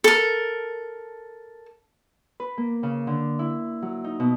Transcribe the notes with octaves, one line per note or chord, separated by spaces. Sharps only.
A4 A#4
B4
A#3
C#3
D3
E4
F#3
D#4
B2